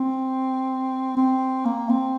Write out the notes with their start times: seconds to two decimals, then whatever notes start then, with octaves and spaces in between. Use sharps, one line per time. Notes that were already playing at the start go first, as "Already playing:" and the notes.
Already playing: C4
1.17 C4
1.65 A#3
1.89 C4